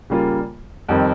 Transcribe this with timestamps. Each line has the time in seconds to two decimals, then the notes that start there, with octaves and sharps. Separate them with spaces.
0.10 C#3 G3 A#3 F4
0.89 F2 D#3 G3 C4